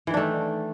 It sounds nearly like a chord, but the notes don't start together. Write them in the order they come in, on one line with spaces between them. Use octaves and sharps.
E3 D#3 D4 A3